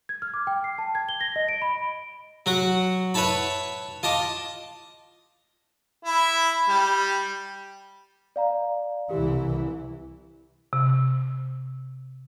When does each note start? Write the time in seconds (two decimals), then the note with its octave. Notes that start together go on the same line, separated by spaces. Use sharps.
0.09 G#6
0.22 F6
0.34 D6
0.47 G5
0.64 C7
0.78 A5
0.95 G#6
1.09 G7
1.21 A#6
1.36 D#5
1.49 D7
1.62 B5
2.46 F#3 F#4 F#5
3.14 B4 C#5 E5 A5 B5
4.03 F4 D#5 A5 D6
6.05 E4
6.68 G3
8.36 D5 F5 A#5
9.11 C2 E3 G4
10.73 C3